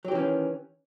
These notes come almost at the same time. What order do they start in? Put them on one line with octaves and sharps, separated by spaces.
F#3 G4 E3 C#4 D#3